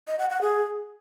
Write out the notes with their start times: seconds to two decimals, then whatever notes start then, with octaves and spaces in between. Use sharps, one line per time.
0.07 D#5
0.19 F#5
0.30 F#5
0.41 G#4